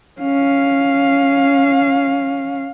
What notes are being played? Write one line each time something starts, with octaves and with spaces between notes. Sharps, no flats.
C#4 F5